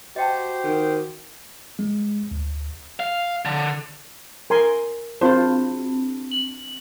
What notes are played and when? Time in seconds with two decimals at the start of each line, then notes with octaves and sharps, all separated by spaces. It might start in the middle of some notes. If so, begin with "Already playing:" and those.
0.16 F#4 G4 C5 D#5 G5 A5
0.64 D#3
1.79 G#3
2.31 D2
3.00 F5
3.45 D3
4.50 A#4 G#5 C6
5.21 C4 D4 F4 C5
6.31 F#7